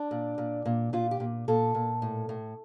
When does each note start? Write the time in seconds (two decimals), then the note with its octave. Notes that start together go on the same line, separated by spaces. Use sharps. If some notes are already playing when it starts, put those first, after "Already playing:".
Already playing: D4
0.11 A#2
0.38 A#2
0.65 A#2
0.93 A#2 F4
1.11 G4
1.20 A#2
1.48 A#2 A4
1.75 A#2
2.02 A2
2.29 A2